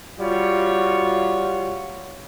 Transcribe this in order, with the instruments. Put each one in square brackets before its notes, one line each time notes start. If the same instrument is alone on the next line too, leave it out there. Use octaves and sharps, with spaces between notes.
[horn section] G3 F4 F#4 C#5